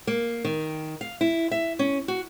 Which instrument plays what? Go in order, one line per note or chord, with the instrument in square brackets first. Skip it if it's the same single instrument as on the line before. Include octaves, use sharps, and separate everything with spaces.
[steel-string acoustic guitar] A#3
D#3
F5
E4
E5
C#4
F#4